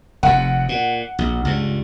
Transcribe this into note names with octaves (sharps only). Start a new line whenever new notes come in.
F1 F2 F#5
A#2
A#1
C#2 G2